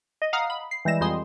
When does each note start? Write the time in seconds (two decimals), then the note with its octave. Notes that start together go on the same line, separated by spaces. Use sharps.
0.22 D#5
0.33 F5 F#5 A#5 D#6 F6
0.50 B5
0.71 C7
0.85 E3 G3 G#3 A#6 E7
1.01 F2 G3 G#3 C6 D#6